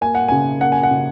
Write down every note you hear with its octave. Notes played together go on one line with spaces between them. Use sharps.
A#3 G#5
F#5
C#3 G#5
A#3 F#5
G#5
F#5
C#3